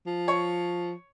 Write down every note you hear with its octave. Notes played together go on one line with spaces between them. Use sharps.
F3
C#5